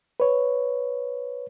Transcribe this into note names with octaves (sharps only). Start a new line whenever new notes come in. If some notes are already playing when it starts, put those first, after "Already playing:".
B4 C#5